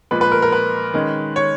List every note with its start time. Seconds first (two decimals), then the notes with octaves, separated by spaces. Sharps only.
0.11 A#2 F3 G#3 B4
0.21 B4
0.32 A#4
0.42 A#4
0.52 B4
0.94 D#3 G#3 C#4
1.36 C#5